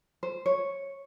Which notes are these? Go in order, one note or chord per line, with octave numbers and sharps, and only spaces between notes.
C5
C#5